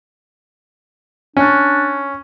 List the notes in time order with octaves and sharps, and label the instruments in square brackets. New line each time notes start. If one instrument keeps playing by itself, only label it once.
[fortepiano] C#4 [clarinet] D4